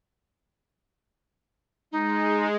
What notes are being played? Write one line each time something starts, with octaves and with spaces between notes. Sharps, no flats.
G#3 D#4